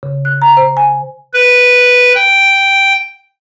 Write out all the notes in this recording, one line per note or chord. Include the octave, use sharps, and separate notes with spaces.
C#3
F#6
A#5
C5
G#5
B4
G5